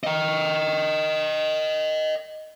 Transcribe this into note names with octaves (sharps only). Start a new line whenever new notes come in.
D#5 G5